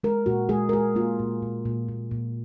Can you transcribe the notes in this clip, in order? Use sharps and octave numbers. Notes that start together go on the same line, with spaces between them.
G#3 A#4
A#2 F#4
G#3 G#4
A#4
G#3 G#4
A#3 F4
A#2
A#2
A#2
A#2
A#2